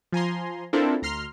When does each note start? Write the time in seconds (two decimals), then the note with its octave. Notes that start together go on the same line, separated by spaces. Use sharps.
0.12 F3 G#5 A#5 C6
0.73 C4 D4 E4 F4 A4 A#4
1.02 D2 A#5 C6 F6 C7